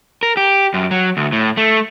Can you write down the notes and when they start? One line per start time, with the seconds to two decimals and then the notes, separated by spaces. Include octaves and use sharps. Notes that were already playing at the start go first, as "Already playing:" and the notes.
0.23 A#4
0.37 G4
0.74 F#2
0.91 F#3
1.17 D2
1.32 A2
1.57 A3